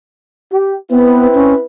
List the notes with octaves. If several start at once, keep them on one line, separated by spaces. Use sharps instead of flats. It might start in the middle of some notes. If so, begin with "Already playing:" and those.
G4
B3 C4 E4 B4
C#4